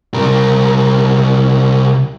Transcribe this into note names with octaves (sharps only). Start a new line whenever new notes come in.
C2 A#4